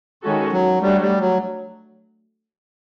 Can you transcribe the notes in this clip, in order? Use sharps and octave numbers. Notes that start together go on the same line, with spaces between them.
D#3 G#3 C#4 F#4 A4
F#3
F#3 G3 A3 D4 F#4
G3
F#3